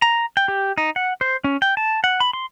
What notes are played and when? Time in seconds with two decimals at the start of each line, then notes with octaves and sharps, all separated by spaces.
0.02 A#5
0.37 G5
0.48 G4
0.78 D#4
0.96 F#5
1.21 C5
1.44 C#4
1.62 G5
1.77 A5
2.04 F#5
2.20 B5
2.33 C6